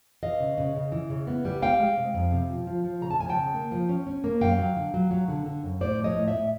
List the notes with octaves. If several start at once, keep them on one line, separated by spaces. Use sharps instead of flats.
E3 D#5 F5
C#3
C#3
C#3
E3
C#3
B3
G3
G#3 F5 G5
G#3
C3
F2
C3
F3
F3
F3
C#3 A#5
A5
F3 G#5
G5 A5
C#3
A#3
F3
C#4
C#4
A#3
F#2 F5 G5
F#3
D3
F#3
F#3
D3
D3
F#2
A2 C5 D5
F3
C#5 D#5
A2
D5 E5
A2